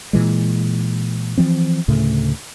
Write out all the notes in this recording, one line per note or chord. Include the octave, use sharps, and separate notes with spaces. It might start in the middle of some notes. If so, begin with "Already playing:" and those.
A#2 E3 G#3
E3 F3 C4
D2 A2 C#3 A3